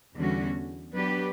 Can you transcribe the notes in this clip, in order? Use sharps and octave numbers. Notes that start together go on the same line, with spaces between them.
E2 D3 G3 C#4 F#4
F#3 B3 D4 G4 B4